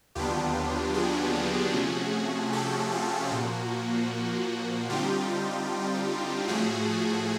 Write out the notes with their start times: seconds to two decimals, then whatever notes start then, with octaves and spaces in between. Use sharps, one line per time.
0.15 D#2 D3 F#3 B3 D4 F4 G4
0.94 F#4 G#4
1.73 C3 F3 A3 C#4
2.52 G4 A4
2.92 F4
3.31 A#2 F3 A#3 F#4
4.90 D3 G3 C4 D#4 F4 G4
6.47 A2 F3 A3 F#4 G#4